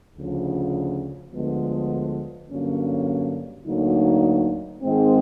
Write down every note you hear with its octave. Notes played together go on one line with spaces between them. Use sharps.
D2 C#3 F3
D2 D3 F3 G#3 B3
G2 D3 F#3 A#3 C#4
D2 D3 F#3 A#3 D#4
G#2 D#3 G#3 C4